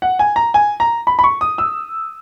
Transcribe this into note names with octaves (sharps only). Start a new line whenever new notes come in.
F#5
G#5
A#5
G#5
A#5
B5
B5
C#6
D#6
E6